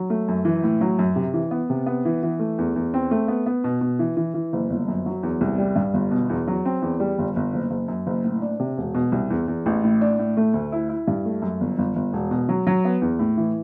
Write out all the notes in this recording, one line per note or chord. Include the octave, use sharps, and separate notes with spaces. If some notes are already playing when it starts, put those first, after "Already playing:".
Already playing: F#3
A3
F#2
E3
A2
F#3
F#2
C3
E3
B3
C3
B3
E3
E3
A3
E2
E2
C4
A3
B3
B3
B2
B2
E3
E3
E3
F#1
G1
F#2
F#3
E2
C2
G3
G2
G1
B2
E2
F#3
C4
E2
G3
G1
G1
F#1
F#1
F#2
F#1
A2
D4
C3
E1
B2
C2
E2
E2
A1
A2
D4
A2
A3
D2
E4
E4
G2
A3
F#2
G1
G1
G1
E1
B2
F#3
F#3
B3
E2
A2
E3